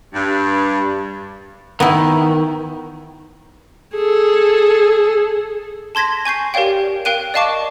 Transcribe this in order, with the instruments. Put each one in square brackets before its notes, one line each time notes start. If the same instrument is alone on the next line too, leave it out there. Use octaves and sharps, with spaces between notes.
[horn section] G2
[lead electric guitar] D#3 [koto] B3 E4
[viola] G#4 A4
[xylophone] A5 C6 G#6 A#6 B6
G#5 C#6 G6 C7
G4 A#4 C#5 D5 F5 G5
A#4 F5 G5 F#6 D#7
D5 D#5 F5 A5 C#6 D6